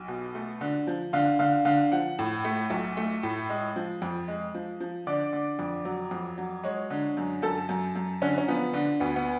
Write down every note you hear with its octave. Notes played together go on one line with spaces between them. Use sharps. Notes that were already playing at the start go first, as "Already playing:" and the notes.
Already playing: B1
B2
A3
D3
F3
D3 F5
D3 F5
D3 F5
F3 F#5
A2
A3
B1
A3
A2
G#3
F3
F2
G#3
F3
F3
D3 D5
D3
F2
F#3
F2
F#3
G#3 C#5
D3
F#2
F#2 A4
F#2
F#2
D3 C#4
C#4
F3 B3
D3
D2 B3
B3